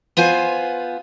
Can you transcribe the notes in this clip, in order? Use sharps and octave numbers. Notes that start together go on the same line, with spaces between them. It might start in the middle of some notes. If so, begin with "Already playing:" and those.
B3 F4 C5 G#5